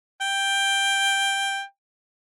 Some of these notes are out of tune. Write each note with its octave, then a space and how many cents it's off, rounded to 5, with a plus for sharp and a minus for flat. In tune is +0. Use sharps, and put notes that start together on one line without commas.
G5 +10